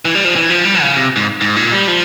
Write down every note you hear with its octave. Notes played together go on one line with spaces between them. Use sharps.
E3
G3
F3
E3
F3
G3
C#3
C3
G#2
G#2
A#2
G3
F3